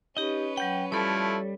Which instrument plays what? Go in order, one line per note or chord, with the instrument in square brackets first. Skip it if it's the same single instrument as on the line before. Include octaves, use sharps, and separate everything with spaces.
[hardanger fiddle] C#4 B4 [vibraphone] D#4 G4 [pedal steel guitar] D#5
[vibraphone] F#3 F#5 [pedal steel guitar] G5 G6
[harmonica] F3 A3 E4 [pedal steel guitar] G3 [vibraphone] A4 C#5